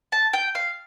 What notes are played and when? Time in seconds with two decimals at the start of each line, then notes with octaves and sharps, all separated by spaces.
0.12 A5
0.33 G5
0.55 F5